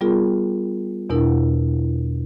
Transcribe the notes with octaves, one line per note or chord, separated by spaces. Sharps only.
G3 B3 F4 G#4 A#4
E2 B2 D4 E4 A#4